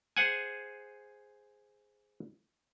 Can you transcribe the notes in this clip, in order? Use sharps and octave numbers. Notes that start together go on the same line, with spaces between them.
G#4 C5 F#5 G#5